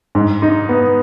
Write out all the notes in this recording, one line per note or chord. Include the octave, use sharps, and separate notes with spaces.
G#2
D#4
B3